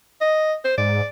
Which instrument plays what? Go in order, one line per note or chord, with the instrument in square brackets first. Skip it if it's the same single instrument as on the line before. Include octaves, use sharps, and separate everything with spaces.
[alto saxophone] D#5
C5
[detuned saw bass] G#2 [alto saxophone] D5